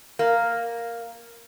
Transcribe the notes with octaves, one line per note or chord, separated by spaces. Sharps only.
A#3